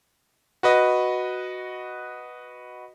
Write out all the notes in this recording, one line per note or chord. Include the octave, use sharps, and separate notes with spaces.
F#4 B4 D#5